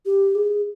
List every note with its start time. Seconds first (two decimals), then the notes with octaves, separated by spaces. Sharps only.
0.06 G4
0.35 G#4